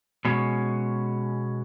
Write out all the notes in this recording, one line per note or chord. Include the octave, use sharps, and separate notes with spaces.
B2 G#3 C#4